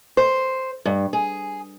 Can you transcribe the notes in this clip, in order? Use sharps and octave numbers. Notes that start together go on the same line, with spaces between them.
C5
G2
G#4